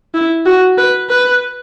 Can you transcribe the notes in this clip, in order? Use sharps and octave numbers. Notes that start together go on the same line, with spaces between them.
E4
F#4
B4
B4